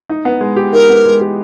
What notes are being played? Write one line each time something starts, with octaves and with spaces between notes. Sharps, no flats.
D#4
B3
G#3
G4
D#4 A#4
B3
G#3
G4